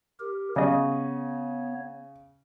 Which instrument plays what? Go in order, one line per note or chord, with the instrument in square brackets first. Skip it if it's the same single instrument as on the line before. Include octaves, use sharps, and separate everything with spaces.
[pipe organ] G4 A#4
[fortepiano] C#3 D#5 [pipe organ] B3 C#5